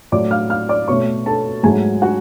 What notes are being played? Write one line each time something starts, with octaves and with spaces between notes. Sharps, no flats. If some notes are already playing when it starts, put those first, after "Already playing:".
A2 F#3 A3 D5 D6
F5 F6
F5 F6
D5 D6
B2 A3 C#5 C#6
A4 A5
G#2 F#3 A3 G#4 G#5
F#4 F#5